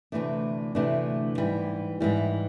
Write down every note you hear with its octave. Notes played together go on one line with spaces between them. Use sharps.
D2 C3 E3 A3 D4
D2 C3 E3 A3 D4
G#2 E3 G3
G#2 E3 G3